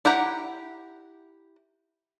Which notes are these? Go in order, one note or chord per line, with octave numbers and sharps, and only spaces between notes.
E4 G4 F#5 A#5